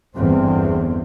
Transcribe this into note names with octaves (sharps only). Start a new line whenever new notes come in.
G1 E2 C4